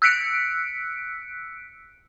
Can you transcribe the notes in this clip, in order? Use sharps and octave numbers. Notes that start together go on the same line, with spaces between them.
E6 F#6 B6 C#7 D7